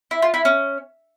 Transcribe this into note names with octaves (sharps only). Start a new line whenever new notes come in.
E4
F4
E4
C#4